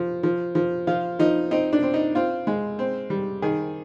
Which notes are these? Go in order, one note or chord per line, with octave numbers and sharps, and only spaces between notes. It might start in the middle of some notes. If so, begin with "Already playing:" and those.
Already playing: F3
F3
F3
F3 F4
F3 D#4
C4 D#4
D4
C4
D#4
C4 F4
G#3
C4
G3
D#3 G#4